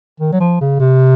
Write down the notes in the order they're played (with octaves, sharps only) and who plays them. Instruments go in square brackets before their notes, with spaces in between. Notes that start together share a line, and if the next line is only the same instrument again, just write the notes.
[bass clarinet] D#3
F#3
F3
C#3
C3